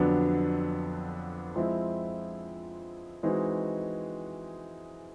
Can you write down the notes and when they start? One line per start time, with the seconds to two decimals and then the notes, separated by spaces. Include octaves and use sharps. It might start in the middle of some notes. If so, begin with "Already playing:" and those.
Already playing: F2 D3 F#3 B3 D4
1.56 F3 G#3 C4 E4
3.23 E3 G#3 C4 D#4 F#4